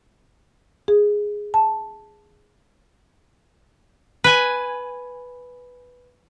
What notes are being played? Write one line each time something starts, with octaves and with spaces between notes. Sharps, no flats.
G#4
A5
B4 G#5